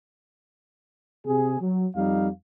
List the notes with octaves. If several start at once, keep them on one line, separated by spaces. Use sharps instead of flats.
C3 G#4
F#3
F2 G3 D#4 F5